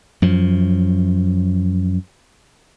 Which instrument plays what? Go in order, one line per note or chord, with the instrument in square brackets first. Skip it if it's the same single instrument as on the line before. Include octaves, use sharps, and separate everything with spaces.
[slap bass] F#2 F3